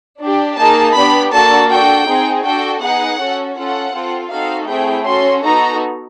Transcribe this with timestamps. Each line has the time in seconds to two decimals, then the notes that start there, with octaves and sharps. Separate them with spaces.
0.20 D4 G4
0.57 A#3 D#4 G#4 A5
0.96 B3 D4 G4 B5
1.32 A#3 D4 F#4 A4 A5
1.70 D4 F#4 A4 G5
2.07 C4 D#4 G#4
2.44 D4 F#4 A4 G5
2.81 B3 D#4 G#4 F#5
3.19 C#4 F#4 A4
3.56 C#4 F4 A4 F#5
3.93 C4 F4 A4
4.31 C4 D#4 F#4 A4 F5
4.68 A3 C4 E4 G#4 G5
5.06 C#4 F#4 A4 C6
5.43 B3 D#4 F#4 A4 A#5